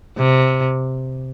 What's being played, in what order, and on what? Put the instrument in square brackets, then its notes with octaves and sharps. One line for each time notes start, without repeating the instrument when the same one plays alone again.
[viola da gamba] C3